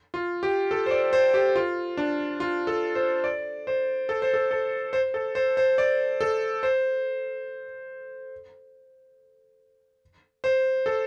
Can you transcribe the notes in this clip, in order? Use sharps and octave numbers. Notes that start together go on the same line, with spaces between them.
F4
G4
A4
C5
D5
C5
G4
F4
D4
F4
A4
C5
D5
C5
A4
C5
A4
A4
C5
A4
C5
C5
D5
A4
C5
C5
A4